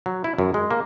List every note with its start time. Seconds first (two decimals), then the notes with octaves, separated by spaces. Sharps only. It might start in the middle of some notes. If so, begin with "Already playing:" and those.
0.06 F#3
0.24 E4
0.38 F#2
0.54 G#3
0.71 A#3